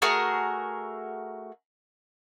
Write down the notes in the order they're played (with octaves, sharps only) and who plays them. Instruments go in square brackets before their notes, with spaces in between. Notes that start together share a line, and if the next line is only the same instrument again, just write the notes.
[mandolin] A3 F#4 G#4 A#4